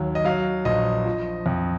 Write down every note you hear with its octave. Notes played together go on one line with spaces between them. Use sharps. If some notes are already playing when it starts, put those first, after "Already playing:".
Already playing: D#2 F#3
D#5
F#3 F5
A#1 D#5
F3
F2